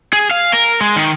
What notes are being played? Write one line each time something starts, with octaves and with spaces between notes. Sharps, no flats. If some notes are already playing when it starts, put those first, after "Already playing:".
G#4
F5
A#4
G#3
D#3